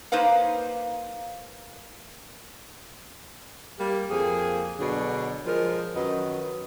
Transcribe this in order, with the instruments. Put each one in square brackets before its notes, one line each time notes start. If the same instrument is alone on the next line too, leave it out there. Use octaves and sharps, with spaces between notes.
[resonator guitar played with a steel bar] A#3 D#4 B4 C5 F5
[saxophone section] G3 A#3 G4
F2 A#3 G#4
B2 D3 F#3 D4 G#4
F3 G#3 A#4
F#2 D#3 F#3 B4 D#5